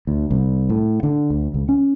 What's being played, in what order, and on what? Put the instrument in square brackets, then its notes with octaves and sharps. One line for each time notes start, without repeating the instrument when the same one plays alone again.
[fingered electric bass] D2
C2
A2
D3
D2
C#2
C#4